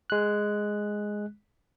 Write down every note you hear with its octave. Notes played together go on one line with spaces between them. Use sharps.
G#3 F#6